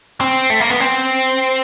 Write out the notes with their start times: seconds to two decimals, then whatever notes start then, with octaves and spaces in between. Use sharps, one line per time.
0.20 C4
0.50 A3
0.60 A#3
0.70 B3
0.80 C4